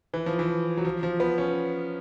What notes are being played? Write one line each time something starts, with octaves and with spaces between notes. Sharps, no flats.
E3
F3
E3
F#3
F3
F3
B3
C#4